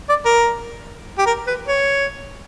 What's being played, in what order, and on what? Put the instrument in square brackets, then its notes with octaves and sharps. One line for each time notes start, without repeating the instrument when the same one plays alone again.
[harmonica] D5
A#4
G4
A#4
B4
C#5